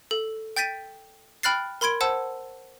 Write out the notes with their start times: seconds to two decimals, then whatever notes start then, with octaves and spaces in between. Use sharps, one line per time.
0.11 A4
0.56 G5 G6 A6 B6 D#7
1.43 G5 B5 F6 F#6 A6 C7
1.81 A#4 B5 C6 G#6 D7
2.01 C5 F#5 A5 E6